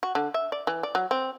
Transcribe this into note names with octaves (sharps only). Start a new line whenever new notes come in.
F#4
D3
E5
D5
E3
D5
F#3
C4